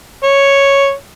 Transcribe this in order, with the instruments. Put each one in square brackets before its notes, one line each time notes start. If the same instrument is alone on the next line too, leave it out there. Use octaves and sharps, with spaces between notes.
[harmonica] C#5